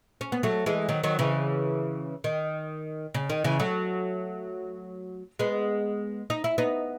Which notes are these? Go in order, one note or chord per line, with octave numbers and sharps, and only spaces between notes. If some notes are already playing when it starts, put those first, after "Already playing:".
C#4
B3
F#3 A3
E3 G#3
D#3 F#3
D#3 F#3
C#3 E3
D#3
C#3
D#3
C#3 E3
F#3 A3
G#3 B3
D#4
E4
B3 D#4